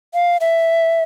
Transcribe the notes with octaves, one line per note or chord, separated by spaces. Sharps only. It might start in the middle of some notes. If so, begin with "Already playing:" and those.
F5
E5